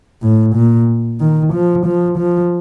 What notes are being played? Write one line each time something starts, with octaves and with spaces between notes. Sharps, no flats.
A2
A#2
D#3
F3
F3
F3